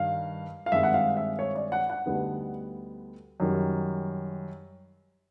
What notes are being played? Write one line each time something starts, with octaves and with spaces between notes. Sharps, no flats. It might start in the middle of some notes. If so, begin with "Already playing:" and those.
Already playing: G2 D#3 F5
F5
G2 D#3 G#3 C4 E5
F#5
F5
E5
C#5
D5
F#5
F#5
D2 D3 G3 B3 D#4
F#2 D#3 G3